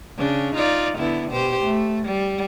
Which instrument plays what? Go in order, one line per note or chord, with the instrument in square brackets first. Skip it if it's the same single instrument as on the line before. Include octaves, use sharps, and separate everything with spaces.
[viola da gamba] C#3 D4
D#4 F4 D5
D3 B3 E4
B2 G4 C5
A3
G3